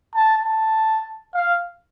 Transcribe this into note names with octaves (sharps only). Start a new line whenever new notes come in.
A5
A5
F5